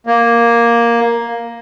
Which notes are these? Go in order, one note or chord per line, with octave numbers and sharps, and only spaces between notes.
A#3